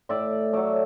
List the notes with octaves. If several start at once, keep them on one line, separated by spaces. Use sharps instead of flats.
A2 D5 E5
F#3 A3 D5 E5